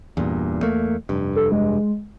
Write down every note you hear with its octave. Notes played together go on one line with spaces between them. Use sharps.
E2 G2 A#2
E2 A3 A#3
F1 G2
A4
G#3